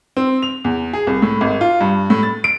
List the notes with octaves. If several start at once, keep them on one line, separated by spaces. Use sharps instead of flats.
C4
F7
E2
G#4
C2
A2
G#1
F4
G2
A2
A6
D7